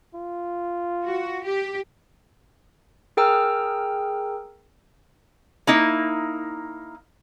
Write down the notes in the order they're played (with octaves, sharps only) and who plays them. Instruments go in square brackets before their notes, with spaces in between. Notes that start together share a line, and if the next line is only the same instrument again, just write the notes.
[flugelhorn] F4
[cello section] F#4
G4
[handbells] G#4 A#4 G5 A#5 E6 F6
[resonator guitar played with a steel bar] A#3 D#4 E4